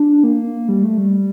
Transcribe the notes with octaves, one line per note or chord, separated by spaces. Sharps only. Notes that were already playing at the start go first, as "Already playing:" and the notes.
Already playing: D4
A#3
G3
A3
G3